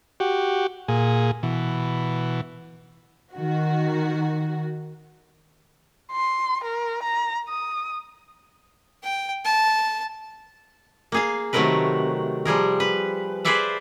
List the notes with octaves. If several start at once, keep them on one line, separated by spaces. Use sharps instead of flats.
F#4 G4
A#2 G#4
B2 E3
D#3 F#4
C6
A#4
A#5
D#6
G5
A5
A#3 G#4 F5
C3 D#3 F#3 A3 A#4 B4
F3 G3 G#4 A#4
B4
G#4 B4 C5 D5 E5 F5